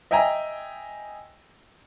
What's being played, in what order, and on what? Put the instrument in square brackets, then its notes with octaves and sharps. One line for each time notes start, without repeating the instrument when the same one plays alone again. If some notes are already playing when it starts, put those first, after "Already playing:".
[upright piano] D#5 E5 G5 G#5 A#5